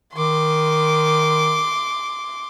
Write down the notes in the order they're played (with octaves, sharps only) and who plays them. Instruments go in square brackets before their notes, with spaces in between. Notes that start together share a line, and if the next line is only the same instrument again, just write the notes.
[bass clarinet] D#3 [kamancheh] C6 D6